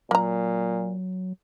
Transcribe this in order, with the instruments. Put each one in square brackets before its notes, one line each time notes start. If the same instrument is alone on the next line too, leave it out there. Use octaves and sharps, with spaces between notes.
[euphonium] A#2 [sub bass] F#3 [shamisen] A#3 A#5